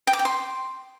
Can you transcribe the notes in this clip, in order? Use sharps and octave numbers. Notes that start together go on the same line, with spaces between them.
G5
D6
G5
C6